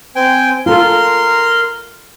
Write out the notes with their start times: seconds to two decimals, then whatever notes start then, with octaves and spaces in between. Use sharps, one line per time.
0.16 C4 G5 G#5
0.66 F4 A4 A#4 C6